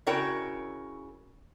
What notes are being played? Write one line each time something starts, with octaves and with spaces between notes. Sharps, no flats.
C#3 E4 F#4 A#4 C#5 G5